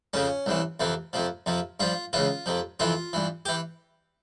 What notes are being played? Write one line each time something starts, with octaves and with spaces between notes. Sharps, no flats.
F2 C#3 F3 C#4
C2 C3 E3
F2 C3 E3
F2 C3 F3
F2 C3 F3
G2 F3 F4
C#2 C#3 E3 F4
F2 C3 F3
F2 C3 E3 F4
G2 E3
G4
E3